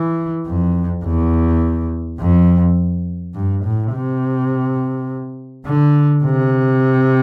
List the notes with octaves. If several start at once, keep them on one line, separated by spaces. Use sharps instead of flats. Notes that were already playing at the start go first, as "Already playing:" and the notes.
Already playing: E3
F2
E2
F2
G2
A2
C3
D3
C3